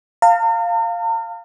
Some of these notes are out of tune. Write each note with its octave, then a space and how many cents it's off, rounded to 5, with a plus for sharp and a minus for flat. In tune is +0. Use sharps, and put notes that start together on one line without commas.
F5 +0 A#5 -45